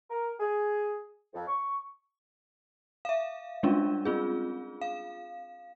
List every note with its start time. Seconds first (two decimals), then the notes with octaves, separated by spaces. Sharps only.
0.10 A#4
0.40 G#4
1.34 F2
1.47 C#6
3.05 E5 F5
3.63 G3 G#3 C#4 D4 F4
4.05 C4 F4 G#4
4.81 F5